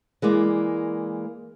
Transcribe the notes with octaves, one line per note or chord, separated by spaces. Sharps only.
E3 G#3 A#3 D5